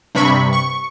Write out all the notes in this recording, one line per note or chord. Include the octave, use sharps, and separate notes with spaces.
G2 C3 B5 C#6
C#6